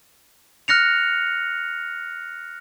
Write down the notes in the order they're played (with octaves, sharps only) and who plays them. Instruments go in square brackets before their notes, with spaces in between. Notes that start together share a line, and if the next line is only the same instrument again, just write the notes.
[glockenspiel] F6 F#6 A#6 C#7 F7